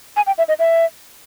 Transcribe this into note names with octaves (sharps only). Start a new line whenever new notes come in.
G#5
G5
E5
D#5
E5